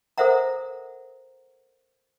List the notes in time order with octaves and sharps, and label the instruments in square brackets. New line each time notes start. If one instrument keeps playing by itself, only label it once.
[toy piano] A4 A#4 C5 E5 F#5 A#5